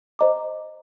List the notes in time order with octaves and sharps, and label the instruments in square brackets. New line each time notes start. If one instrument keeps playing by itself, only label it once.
[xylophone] C5 D#5 A#5 D6